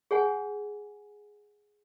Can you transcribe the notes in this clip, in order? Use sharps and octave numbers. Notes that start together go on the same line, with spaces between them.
G#4 C#5 F#5 G#5